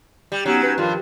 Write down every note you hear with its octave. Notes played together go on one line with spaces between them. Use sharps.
G3
F#3 B3 C#4 D#4
C#4 D#4 B4
G2 D#3 F3 F4